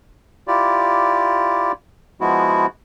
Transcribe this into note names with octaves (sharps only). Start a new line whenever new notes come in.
E4 F4 G4 D5
F3 G#3 B3 E4 F#4